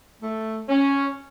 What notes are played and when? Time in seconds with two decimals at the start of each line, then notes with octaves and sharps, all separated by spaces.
0.22 A3
0.69 C#4